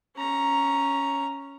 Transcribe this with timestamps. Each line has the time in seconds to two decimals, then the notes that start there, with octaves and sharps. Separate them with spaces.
0.17 C#4 A#5